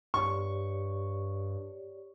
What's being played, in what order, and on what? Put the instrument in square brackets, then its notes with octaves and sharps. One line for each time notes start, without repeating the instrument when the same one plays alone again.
[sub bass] G2 [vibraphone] G4 C#5 D5 [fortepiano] C#6